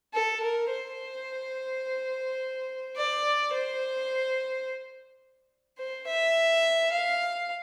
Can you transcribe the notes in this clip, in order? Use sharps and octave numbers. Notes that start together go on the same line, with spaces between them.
A4
A#4
C5
D5
C5
C5
E5
F5